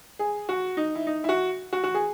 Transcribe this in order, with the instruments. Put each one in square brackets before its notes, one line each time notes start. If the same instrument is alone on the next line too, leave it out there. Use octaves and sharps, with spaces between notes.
[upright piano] G#4
F#4
D#4
E4
D#4
E4
F#4
F#4
F#4
G#4